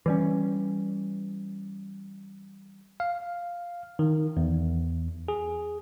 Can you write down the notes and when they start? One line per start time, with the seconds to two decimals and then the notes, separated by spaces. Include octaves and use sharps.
0.06 E3 G3 C#4
3.00 F5
3.99 D#3
4.37 E2
5.28 G#4